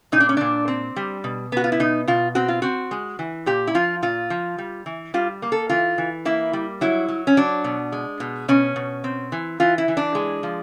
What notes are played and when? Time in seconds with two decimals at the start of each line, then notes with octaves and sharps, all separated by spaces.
0.12 A#2 D#4
0.20 D4
0.29 C#4
0.37 A#2 D4
0.68 C4
0.96 G3
1.24 B2
1.52 B3 F#4
1.64 F4
1.72 E4
1.80 B2 D#4
2.08 B2 F4
2.35 C4 F#4
2.48 F4
2.62 C4 F#4
2.91 G#3
3.19 E3
3.46 A#2 G4
3.67 E4
3.75 F3 F4
4.02 A#2 F4
4.30 F3
4.58 G3
4.86 E3
5.14 G3 F4
5.42 A#3
5.52 A4
5.69 E3 F4
5.98 E3
6.25 A#3 E4
6.53 G3
6.81 F#3 E4
7.08 F#3
7.27 C#4
7.37 F#3 D4
7.64 B2
7.92 G#3
8.20 B2
8.48 B2 C#4
8.76 B2
9.04 C4
9.32 E3
9.60 E3 F4
9.78 E4
9.88 E3
9.97 D4
10.15 G#3
10.43 F3